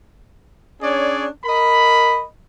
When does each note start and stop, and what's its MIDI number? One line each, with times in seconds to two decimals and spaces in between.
0.81 1.27 61
0.81 1.27 62
0.81 1.27 68
0.81 1.27 73
0.81 1.27 74
1.45 2.24 70
1.45 2.24 75
1.45 2.24 83